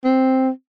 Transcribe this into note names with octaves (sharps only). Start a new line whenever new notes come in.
C4